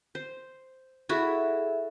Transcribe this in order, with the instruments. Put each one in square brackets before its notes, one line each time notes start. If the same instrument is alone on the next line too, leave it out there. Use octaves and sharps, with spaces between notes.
[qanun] C5
[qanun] E4 F#4 [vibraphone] G#4 A4 E5